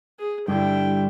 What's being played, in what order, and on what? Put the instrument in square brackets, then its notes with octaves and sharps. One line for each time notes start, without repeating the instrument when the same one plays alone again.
[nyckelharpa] G#4
[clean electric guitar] G2 D3 [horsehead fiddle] G3 E4 [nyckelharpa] G5